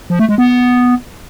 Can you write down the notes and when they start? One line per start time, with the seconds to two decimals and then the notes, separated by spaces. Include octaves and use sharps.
0.10 F3
0.19 A3
0.29 G#3
0.38 B3